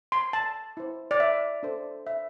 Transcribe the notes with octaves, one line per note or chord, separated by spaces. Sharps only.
C6
A5
E4 C5
D5
E5
D4 A4 C5
E5